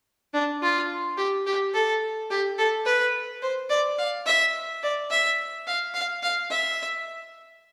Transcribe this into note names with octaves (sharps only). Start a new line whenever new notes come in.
D4
F4
G4
G4
A4
G4
A4
B4
C5
D5
F5
E5
D5
E5
F5
F5
F5
E5